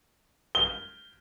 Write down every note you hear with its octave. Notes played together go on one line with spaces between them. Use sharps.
G7